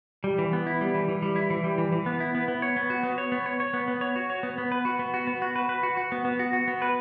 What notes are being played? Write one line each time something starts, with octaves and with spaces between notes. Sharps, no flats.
G3
E3
B3
E4
G3
E3
E3
G3
E4
E3
G3
E3
E3
B3
E4
B3
B3
C#5
B3
F#4
B3
C#5
B3
C#5
C#5
B3
B3
C#5
F#4
C#5
B3
B3
B4
F#4
B3
F#4
B3
F#4
B4
B4
F#4
F#4
B3
B3
F#4
F#4
B3
B4